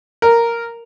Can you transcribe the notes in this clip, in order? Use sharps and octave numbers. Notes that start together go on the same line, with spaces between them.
A#4